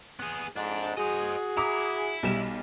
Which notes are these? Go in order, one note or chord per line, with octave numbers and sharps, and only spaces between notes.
B3 G#4
F2 G#2 D4
F#4 G#4 C5 D#5
E4 A#5 D6 D#6
B1 G3 E7